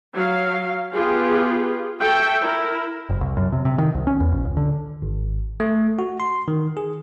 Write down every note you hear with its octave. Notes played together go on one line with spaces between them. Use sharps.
F#3 F5
B3 F4 G4 G#4
F#4 A4 E5 G5
E4 A#4
F#1
C2
F#2
C3
C3
D#3
C2
C#4
E2
A#1
C#2
D3
G#1
A3
F#4
C6
D#3
G#4